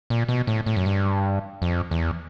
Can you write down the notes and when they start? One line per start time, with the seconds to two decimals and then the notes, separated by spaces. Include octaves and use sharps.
0.10 A#2
0.28 B2
0.47 A2
0.66 A2
0.77 F#2
0.86 G2
1.62 F2
1.91 E2